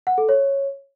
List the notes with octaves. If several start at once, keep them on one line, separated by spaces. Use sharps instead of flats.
F#5
A4
C#5